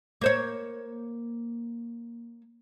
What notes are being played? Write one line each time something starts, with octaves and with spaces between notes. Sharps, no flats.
A#3 C5 C#5